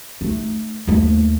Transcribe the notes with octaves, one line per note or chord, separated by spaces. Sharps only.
A3 D#4
D#2 A3